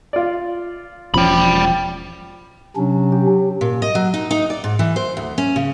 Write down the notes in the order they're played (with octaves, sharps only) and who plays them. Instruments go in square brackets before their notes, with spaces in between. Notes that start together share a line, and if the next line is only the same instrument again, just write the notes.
[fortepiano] F4 D5
[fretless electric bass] E1 F3 C#4 [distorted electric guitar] G5 B5
[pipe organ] C3 C#4 D4 [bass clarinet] F#3
[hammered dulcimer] G4
[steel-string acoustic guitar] A#2
D#5
F#3
D#4
D#4
D5
G#2
E3
C5
D2
C#4
C#3